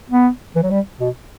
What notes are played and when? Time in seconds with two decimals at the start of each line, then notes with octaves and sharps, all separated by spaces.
0.10 B3
0.56 E3
0.63 F#3
0.71 G3
1.00 B2